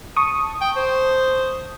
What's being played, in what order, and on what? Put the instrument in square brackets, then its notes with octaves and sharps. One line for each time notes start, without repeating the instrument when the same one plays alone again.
[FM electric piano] A5 C#6 D#6
[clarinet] G5
C5